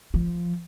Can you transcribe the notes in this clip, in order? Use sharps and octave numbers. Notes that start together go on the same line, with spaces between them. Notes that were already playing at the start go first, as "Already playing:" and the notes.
F3